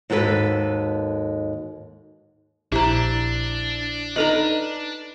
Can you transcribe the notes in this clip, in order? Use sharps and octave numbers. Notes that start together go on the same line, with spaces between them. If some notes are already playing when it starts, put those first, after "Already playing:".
D#2 G#2 F#4 A4 B4
A#1 D4 E4 G4 C5 A#5
D#4 A4 B4 D#5 A#5 B5